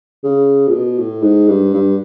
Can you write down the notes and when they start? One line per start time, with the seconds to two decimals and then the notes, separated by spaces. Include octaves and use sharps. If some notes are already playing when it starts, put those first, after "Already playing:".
0.24 C#3
0.68 A#2
0.73 B2
0.99 A2
1.23 G#2
1.48 G2
1.73 G2